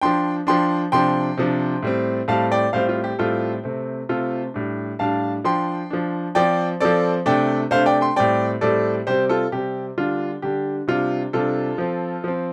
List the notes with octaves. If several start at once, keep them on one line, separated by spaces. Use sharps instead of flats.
F3 D4 G5 C6
F3 D4 G5 C6
C3 F3 D4 G5 C6
C3 F3 D4
A2 G3 C4
A2 G3 C4 F5 A5
D5 G5
A2 G3 C4 C5 F5
F4
G4
A2 G3 C4 F4 A4
C3 A3 C4
C3 A3 C4 F4 A4
A2 G3 D4
A2 G3 D4 F5 A5
F3 D4 G5 C6
F3 D4
F3 C4 D5 G5
F3 C4 A4 D5
C3 A3 D4 D5 G5
C3 A3 D4 C5 F5
D5 G5
G5 C6
A2 G3 C4 D5 G5
A2 G3 C4 A4 D5
C3 G3 C4 G4 C5
F4 A4
C3 G3 C4 G4
D3 G3 D4 F4
D3 G3 D4 G4
C3 G3 D4 F4
C3 G3 D4 F4 A4
F3 C4
F3 C4